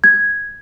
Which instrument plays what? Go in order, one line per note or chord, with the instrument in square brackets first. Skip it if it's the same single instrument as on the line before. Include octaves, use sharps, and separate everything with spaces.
[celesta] G#6